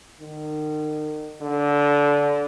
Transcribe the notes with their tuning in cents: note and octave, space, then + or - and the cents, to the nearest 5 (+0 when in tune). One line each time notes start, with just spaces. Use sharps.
D#3 -35
D3 -20